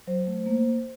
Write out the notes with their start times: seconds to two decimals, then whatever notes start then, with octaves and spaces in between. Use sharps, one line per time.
0.07 F#3 C5
0.27 A3
0.46 A#3